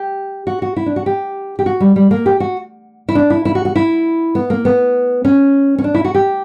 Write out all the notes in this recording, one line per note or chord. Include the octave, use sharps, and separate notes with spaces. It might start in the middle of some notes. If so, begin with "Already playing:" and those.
Already playing: G4
F#4
F#4
E4
D4
F#4
G4
G4
F#4
G3
G3
A#3
G4
F#4
E4
D4
E4
E4
F#4
F#4
E4
B3
A#3
B3
C#4
C#4
D4
E4
F#4
G4